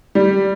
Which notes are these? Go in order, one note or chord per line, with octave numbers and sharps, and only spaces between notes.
G3